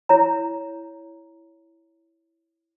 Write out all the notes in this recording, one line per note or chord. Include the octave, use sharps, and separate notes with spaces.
E4 C#5 A#5